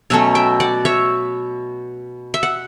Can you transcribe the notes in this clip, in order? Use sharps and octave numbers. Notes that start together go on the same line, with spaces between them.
B2 F#3 A3 C#4 C#5 E5
E5 G5
D5 F#5
C#5 E5
E5
F#5